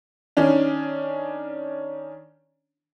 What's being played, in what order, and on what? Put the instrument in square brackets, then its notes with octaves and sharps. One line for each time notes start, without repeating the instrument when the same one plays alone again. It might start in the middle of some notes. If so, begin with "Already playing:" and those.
[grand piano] D#3 C#4 D4